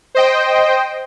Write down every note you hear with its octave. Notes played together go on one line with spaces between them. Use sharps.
C5 D#5 G5